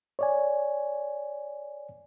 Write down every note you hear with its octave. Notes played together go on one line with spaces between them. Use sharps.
C#5 D5 G#5